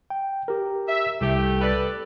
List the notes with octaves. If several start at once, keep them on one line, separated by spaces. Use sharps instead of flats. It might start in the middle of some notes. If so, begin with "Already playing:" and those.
G5
G4 A#4
E5
C2 A3 G4
A4 B4 D5